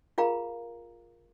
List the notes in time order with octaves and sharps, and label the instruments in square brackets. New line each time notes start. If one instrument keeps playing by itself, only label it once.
[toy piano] F4 G#4 A#4 F5 G5 A#5